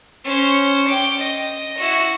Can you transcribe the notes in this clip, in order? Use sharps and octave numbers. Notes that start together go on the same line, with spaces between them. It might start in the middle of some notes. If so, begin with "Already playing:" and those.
C#4 C5
G5 D6
D#5
E4 F#4